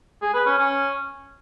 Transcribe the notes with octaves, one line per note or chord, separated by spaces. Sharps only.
G#4
B4
C#4
C#4